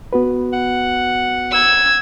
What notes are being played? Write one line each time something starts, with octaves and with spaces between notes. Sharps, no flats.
B3 F#4 B4
F#5
E6 G#6